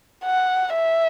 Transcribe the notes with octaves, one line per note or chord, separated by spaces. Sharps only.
F#5
E5